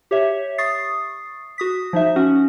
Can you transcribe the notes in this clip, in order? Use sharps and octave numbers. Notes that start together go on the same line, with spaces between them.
G4 C#5 E5
C#6 D#6 A6 C7
F#4 D#6 B6
F3 D#4 E5
C#4 F#4 F#5